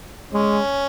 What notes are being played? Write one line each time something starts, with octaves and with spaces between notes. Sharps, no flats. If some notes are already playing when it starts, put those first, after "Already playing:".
G#3 C#4